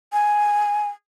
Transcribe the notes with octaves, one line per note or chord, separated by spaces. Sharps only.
G#5